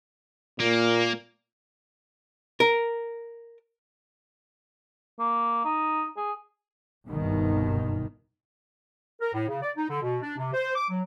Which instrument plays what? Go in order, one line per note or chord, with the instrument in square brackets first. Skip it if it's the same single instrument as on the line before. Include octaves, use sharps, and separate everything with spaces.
[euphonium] A#2 [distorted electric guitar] A#3
[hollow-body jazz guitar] A#4
[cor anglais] A#3
D#4
G#4
[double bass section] F#1 C2 G2 B2 D#3
[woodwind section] A#4
A2
C#3
D5
D#4
D3
B2
D4
C3
C5
D6
F#3